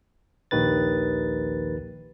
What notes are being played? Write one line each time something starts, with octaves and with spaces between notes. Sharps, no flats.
A#1 D#2 D#3 B4 A6